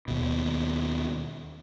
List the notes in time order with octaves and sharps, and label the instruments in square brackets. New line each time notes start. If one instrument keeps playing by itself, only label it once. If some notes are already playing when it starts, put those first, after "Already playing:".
[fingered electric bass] D#2 B2